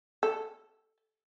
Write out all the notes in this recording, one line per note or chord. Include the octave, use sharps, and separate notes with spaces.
A4